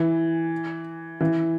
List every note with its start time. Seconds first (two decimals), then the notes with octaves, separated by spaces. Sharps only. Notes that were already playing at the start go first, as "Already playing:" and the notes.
Already playing: E3
1.21 E3